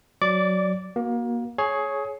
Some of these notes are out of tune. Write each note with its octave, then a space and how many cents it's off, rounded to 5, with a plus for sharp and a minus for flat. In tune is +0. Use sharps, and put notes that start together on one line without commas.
F#3 +0 D5 +0 D6 -25
A#3 +30 F#4 +0
G#4 +20 C#5 +0